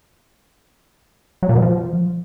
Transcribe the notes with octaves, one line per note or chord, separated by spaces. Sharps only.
F#3
A#2
B2
F3